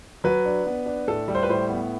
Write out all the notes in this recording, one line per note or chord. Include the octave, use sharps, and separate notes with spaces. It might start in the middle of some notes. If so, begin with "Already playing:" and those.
F#3 B4
D4
B3
D4
A2 A4
G3
C5
B4
A2 C5
B3